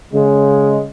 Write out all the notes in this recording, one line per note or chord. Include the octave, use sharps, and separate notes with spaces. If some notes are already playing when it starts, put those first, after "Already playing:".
C#3 G#3